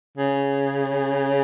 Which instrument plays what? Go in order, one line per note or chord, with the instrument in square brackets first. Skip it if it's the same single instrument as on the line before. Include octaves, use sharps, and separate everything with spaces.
[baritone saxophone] C#3